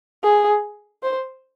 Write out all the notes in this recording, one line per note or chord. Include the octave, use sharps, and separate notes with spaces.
G#4
C5